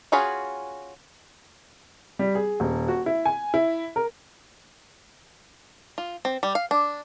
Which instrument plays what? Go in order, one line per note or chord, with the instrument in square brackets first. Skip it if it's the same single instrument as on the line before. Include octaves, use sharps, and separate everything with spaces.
[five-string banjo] C#4 F4 F#4 G#4 B5
[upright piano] G3
G#4
D#1
F#4
E4
G#5
E4
A#4
[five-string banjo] F4
C4
G3
F5
D4